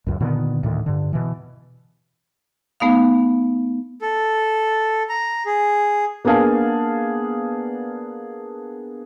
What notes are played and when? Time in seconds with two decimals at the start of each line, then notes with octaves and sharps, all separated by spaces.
0.07 C#2 F#2
0.21 A#2 D3 D#3 B3
0.63 D2 A2 D#3
0.86 G2 D3
1.13 B2 E3
2.80 A3 B3 D#4 F5
4.01 A4
5.09 A#5
5.46 G#4
6.25 A#3 B3 D4 G#4 F5 A5